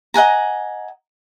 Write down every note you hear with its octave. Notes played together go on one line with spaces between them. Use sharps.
D#5 F#5 G#5 A#5